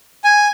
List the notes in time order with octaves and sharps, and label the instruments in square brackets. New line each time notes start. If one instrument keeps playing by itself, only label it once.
[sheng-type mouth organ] G#5